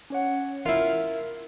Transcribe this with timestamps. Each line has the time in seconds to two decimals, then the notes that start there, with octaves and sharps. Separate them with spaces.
0.10 C#4 C#5 F#5
0.66 E4 F4 A#4